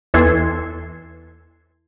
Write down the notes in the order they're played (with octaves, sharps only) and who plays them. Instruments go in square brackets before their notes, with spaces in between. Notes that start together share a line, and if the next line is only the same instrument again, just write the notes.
[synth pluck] E2 E3 A4 C6 G#6